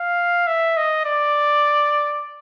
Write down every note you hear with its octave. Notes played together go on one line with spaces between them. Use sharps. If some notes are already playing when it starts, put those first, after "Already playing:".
Already playing: F5
E5
D#5
D5